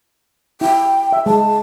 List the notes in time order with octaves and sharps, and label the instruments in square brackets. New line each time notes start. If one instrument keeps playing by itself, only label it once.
[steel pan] E4 [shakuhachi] G5
[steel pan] E5
[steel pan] G#3 [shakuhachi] A5